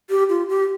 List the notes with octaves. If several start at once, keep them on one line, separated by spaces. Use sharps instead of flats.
G4
F4
G4